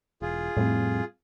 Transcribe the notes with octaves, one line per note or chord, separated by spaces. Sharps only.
E1 F4 G#4
F2 A2 G3 C4